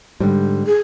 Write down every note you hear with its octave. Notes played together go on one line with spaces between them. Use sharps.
G#2 D3 G3
G#4